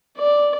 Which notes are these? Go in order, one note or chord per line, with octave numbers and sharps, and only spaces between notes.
D5